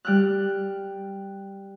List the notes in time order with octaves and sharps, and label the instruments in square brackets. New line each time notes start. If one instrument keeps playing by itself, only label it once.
[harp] G3 G5 F6 F#6